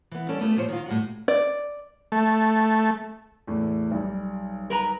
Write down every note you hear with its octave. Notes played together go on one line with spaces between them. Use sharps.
E3 B3
G3 C#4 A4 D5
A3 B3 F4 G4 A4
A#2 F3 C5 C#5
D#3 F4
A2 G3 F#4
D5
A3
E2 A2 A3
B1 G3
A#4 B4 A#5